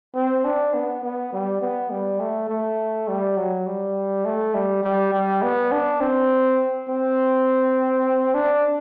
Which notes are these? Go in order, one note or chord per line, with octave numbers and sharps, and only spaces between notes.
C4
D4
B3
B3
G3
B3
G3
A3
A3
G3
F#3
G3
A3
G3
G3
G3
B3
D4
C4
C4
D4